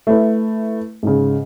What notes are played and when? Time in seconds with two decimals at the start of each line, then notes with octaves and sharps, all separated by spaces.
0.07 A3 E4 B4
1.03 G#2 C#3